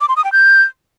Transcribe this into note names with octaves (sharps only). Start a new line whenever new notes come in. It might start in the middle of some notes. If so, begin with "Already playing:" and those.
D6
C6
D#6
G5
G6